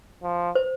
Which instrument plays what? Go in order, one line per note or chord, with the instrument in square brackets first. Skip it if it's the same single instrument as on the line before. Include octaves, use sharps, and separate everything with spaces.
[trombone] F3
[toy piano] C5